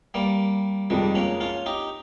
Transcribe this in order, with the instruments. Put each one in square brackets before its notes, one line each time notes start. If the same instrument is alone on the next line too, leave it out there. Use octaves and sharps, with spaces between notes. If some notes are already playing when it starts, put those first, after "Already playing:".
[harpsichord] G3 A#3
[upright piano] F2 C3 F3 G#3 [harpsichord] D#3 G3
[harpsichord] A#3 C#4
C#4 F4
D#4 G4